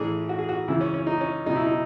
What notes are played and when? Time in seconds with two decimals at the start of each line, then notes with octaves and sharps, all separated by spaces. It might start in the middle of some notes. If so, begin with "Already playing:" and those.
Already playing: A1 A2 E3 G#4
0.29 F#4
0.39 G#4
0.49 F#4
0.68 C#2 C#3 E3 E4
0.81 C#4
0.94 C#4
1.07 D#4
1.21 C#4
1.46 C#2 B2 F#3 D#4
1.56 E4
1.66 D#4